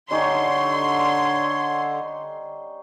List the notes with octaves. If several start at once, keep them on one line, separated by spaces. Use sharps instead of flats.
D3 G3 C#4 D#4 C#5 C6